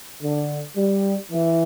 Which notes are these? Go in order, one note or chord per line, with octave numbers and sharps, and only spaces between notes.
D3
G3
E3